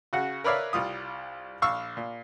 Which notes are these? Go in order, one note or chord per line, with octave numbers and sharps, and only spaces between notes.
C#3 F#4 F#5
A#4 B4 C#5 D5 E5 F5
C2 G3 F4 D#6
A#1 F5 C#6 E6
A#2